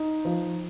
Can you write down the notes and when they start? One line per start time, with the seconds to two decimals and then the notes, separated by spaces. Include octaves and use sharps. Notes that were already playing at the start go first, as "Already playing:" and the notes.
Already playing: D#4
0.25 F3